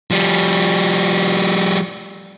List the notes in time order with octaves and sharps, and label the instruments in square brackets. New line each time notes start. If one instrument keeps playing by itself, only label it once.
[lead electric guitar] F3 G3